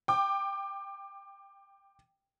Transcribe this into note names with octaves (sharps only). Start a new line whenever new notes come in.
G5 D6